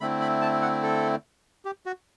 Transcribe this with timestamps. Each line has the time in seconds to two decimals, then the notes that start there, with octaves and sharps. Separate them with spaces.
0.01 D3 A3 C4 E4 B5
0.21 B5
0.42 A5
0.62 F#5
0.83 A4
1.65 G4
1.86 F#4